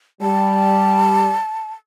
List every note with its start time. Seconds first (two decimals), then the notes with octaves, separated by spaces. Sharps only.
0.21 G3 A5